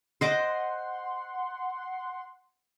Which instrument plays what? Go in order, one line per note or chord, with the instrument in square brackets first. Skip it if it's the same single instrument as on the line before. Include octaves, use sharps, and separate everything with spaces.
[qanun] C5 D#5 D6 [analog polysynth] F#5 C6